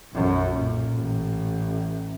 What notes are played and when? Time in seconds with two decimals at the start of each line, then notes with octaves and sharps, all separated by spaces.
0.14 B1 F#2
0.55 A#2
0.95 A1